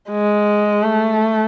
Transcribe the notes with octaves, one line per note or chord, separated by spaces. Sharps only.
G#3
A3